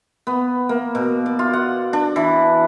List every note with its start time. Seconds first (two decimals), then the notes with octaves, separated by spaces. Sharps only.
0.27 B3
0.69 A#3
0.95 B2
1.26 D5
1.39 F4
1.53 F#5
1.93 D4
2.16 E3